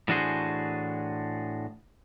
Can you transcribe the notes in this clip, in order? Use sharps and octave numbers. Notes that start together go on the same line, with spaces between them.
A2 E3 D4 F#4 G#4 C5